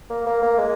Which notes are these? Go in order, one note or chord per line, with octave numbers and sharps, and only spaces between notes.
A#3
A#3
A#3
G#3